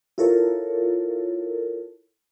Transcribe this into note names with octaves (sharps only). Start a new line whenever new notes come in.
E4 F4 A4 A#4 C#5